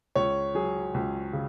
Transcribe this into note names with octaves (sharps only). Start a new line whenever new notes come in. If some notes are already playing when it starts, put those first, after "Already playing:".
C#2 C#5
F#3 G#4
C#2
C#3